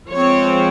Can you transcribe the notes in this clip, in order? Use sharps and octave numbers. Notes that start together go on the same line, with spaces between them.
F3 G#3 C4 C#5